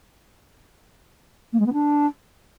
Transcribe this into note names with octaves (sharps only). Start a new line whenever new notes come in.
A#3
G#3
B3
D4